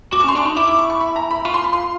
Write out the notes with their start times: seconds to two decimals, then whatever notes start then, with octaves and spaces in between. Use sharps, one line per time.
0.12 F#4 D6
0.20 C#6
0.24 C#4 C6
0.35 D4 C#6
0.45 D#4
0.56 E4 D6
0.67 D6
0.79 C#6
0.90 C#6
1.00 B5
1.16 A#5
1.31 B5
1.45 F4 C#6
1.54 C6
1.64 B5
1.73 C6